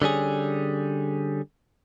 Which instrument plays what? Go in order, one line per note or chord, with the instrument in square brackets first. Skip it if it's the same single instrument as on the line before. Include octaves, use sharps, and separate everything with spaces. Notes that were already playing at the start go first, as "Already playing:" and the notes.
[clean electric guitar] D3 G3 C#4 G#4